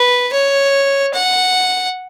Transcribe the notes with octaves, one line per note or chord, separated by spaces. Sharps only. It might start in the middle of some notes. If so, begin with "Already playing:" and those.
Already playing: B4
C#5
F#5